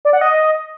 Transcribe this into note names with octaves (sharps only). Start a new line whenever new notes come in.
D5
F#5
D#5